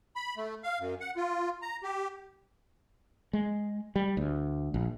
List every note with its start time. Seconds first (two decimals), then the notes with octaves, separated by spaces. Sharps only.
0.16 B5
0.37 A3
0.64 F5
0.80 F#2
1.01 F#5
1.16 F4
1.62 A#5
1.83 G4
3.33 G#3
3.96 G3
4.17 D2
4.74 A#1